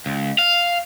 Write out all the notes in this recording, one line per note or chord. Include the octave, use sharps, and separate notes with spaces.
C#2
F5